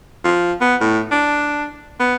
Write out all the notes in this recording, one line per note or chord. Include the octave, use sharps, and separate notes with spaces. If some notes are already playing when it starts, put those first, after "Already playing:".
F3
B3
A2
D4
B3